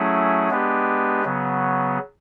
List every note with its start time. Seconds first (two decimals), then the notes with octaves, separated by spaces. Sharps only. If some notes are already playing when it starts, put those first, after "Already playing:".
Already playing: F#3 A3 C#4 E4 G#4
0.50 G#3 B3 D4 G4 B4
1.24 C#3 F#3 B3